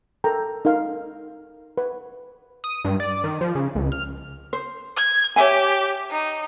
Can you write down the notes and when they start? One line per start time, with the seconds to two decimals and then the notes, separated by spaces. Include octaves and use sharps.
0.24 A4 A#4 G5 A#5
0.65 D#4 A#4 F5
1.77 B4
2.64 D#6
2.84 G2
3.00 D5
3.24 D#3
3.41 F3
3.55 C#3
3.75 C#2
3.92 F6
4.53 C5
4.96 G#6
5.36 G4 C#5 E5 G#5
6.10 D#4